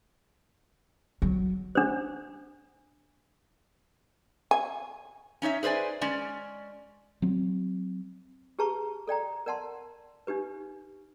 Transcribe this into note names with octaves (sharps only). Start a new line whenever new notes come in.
F#3
D4 C5
G#5
C#4 D#4 C#5 E5
G#4 B4 C5 D5 G#5
G#3 C#4 D5
F#3 C4
G4 G#4 B4 A5 A#5 C#6
A4 D5 G5 A#5
A#4 D5 F#5 A5 C6
D4 D#4 G4 B4